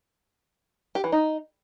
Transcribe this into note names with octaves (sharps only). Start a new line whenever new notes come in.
G4
E3
D#4